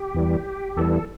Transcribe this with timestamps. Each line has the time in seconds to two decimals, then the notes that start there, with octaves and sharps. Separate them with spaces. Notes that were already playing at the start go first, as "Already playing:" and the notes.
Already playing: G4
0.14 E2 E3 G3
0.77 E2 E3 G3 A4